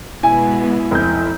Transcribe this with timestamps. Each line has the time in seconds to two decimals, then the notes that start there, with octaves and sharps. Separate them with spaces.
0.23 B2 G#3 B3 E4 G#5
0.91 F1 G6